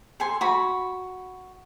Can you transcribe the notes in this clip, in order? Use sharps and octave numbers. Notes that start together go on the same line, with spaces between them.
A4 G#5 C6
F#4 B5